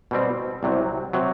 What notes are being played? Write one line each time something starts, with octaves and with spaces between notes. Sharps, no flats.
B2 G3 C4
C2 C3 F#3
C3 F#3